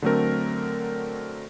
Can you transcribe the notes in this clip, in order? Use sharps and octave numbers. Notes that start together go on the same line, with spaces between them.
D3 F#3 A3 C4 A#4